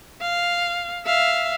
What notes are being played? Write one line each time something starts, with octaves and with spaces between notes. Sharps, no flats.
F5
E5 F5